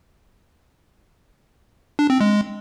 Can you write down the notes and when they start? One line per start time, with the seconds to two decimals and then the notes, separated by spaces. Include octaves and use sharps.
1.99 D4
2.10 C4
2.21 G#3